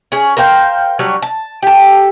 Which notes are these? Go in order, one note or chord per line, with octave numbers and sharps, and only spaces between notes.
C#4 G#4
A#4 C5 F5 G5
F#3 G3 D4 C#5
A5
G4 A4